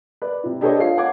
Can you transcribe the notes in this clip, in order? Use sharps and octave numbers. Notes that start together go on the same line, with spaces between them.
B4 D5
C3 E4
D4 G4 A4 B4 C#5 D#5
F4 C#5 F5 C7
C#5 F#5 D6 G#6